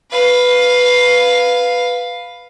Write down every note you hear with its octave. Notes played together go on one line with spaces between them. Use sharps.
B4 F5